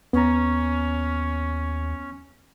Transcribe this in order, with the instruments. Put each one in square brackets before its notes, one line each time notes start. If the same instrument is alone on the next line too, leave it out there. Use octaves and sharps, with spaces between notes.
[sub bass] D#2 [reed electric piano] B3 A#5 [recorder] C#4